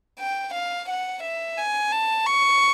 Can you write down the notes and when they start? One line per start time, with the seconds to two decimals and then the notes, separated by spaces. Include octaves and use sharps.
0.19 G5
0.54 F5
0.89 F#5
1.23 E5
1.58 G#5
1.92 A5
2.26 C#6